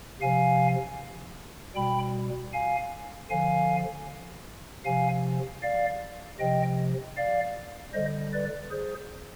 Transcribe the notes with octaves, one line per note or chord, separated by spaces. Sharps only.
C3 F3 F5 G#5
B2 G3 G5 B5
F5 G#5
D3 F3 F5 G#5
C3 F3 F5 G#5
D5 F5
C3 F3 D#5 G5
D5 F5
D3 G3 C5 D#5
B4 D5
G#4 C5